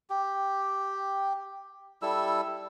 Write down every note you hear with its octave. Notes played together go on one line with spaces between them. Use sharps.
G4
G3 E4 A4 E6